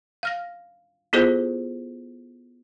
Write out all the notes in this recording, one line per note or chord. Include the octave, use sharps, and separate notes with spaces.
F5 F6 A#6
B3 E4 F4 G#4 A4 C5